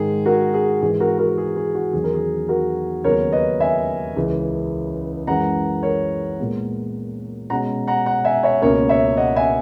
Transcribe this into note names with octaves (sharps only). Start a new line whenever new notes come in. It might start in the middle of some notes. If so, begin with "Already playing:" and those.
Already playing: G#2 D#3 G#3 G#4
F#4 A#4
G#4
G#2 E3 G#3 G#4
F#4 A#4
F#4 A#4
G#4
G#4
F#4
E2 D#3 F#3 G#4
A#4
G#4
F#4 A#4
D#2 C#3 F#3 B3 A#4 C#5
B4 D#5
E5 G#5
C#2 C#3 E3
F#2 E3 G#3 F#5 A#5
A#4 C#5
A#2 G#3 B3
B2 G#3 C#4 F#5 A#5
F#5 A#5
F#5 A#5
E5 G#5
C#5 E5
C#2 B2 A#3 C#4 A#4 C#5
C#5 E5
D#5 F#5
E5 G#5